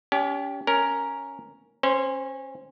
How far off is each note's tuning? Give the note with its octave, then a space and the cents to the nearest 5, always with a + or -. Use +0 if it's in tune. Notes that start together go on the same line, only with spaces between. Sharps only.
C#4 +35 G4 +0
C#4 +0 A#4 +0
C#4 -30 C5 +0